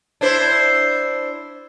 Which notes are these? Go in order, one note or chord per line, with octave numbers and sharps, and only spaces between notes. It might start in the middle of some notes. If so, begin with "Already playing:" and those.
D4 E4 C5